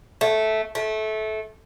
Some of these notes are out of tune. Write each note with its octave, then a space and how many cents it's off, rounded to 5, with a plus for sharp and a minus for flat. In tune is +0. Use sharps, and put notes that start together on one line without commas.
A3 -10
A3 -20